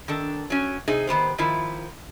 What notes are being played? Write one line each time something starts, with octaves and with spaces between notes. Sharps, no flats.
D#3 D4 A4
F#3 C#4
C3 D#4 G#4
D#3 B3 G4 C5
D#3 F3 E4